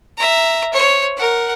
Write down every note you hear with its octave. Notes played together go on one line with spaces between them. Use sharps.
E5 A#5
C5 C#5
A#4 F#5